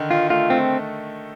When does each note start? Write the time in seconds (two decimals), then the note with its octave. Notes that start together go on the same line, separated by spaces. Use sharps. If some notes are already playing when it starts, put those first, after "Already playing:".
Already playing: D3 D#3
0.11 D#3 F4
0.30 A3 F4
0.50 A3 C4